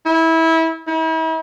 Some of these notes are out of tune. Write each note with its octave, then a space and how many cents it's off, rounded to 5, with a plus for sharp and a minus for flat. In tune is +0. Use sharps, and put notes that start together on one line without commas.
E4 -20
E4 -40